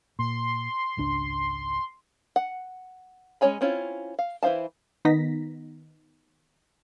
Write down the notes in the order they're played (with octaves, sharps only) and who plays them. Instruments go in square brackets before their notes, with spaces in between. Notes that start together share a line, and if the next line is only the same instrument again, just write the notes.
[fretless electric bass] A#2 [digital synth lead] C6
[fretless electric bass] G#1 C#2 D4
[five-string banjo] F#5
G#3 C#4 C#5 G#5 B5
C4 C#4 E4 F4
F5
E3 E4 C5 F5 A5
[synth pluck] D#3 B3 D#4 A#6 B6